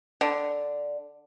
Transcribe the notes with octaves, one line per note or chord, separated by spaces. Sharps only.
D3